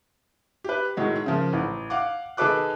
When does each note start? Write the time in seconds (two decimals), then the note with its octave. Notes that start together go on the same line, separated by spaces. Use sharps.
0.64 G4 B4
0.97 A2 D#3 F#3 G#3
1.26 C#3 F3 A#3
1.53 A1
1.90 F5 F#5 D6
2.37 D#3 G#4 A4 B4 D6 F#6